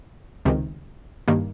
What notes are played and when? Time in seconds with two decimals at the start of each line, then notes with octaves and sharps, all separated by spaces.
0.45 C#2 C3 D#3
1.28 G2 D#3 A#3